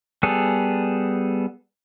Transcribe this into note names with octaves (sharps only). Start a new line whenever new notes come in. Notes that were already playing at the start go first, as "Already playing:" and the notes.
G3 B3 G#4 A4